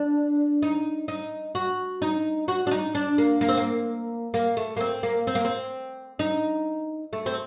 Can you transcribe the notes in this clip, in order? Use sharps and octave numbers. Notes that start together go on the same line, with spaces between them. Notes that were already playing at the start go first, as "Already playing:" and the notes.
Already playing: D4
D#4
D#4
F#4
D#4
F#4
D4
D#4
D4
A#3
A#3
C4
A#3
A#3
A3
A#3
C4
A#3
C4
A#3
C4
D#4
A3
C4